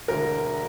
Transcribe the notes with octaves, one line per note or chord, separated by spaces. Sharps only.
E1 D2 D3 A#4